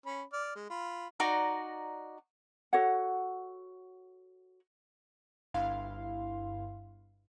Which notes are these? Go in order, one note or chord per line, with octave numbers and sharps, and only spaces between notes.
C#4 B5
D5 F6
G#3
F4 B5
D#4 F#4 D5 A#5
F#4 A4 C#5 F#5
G1 G2 E4 F5 C6